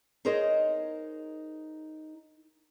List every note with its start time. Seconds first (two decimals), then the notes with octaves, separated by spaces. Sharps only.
0.25 D#4 G#4 A#4 C5 C#5 D#5